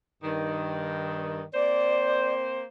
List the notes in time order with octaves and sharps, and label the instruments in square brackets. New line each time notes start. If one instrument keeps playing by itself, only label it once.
[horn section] G2 D#3
[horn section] A#3 C4 C5 [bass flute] D5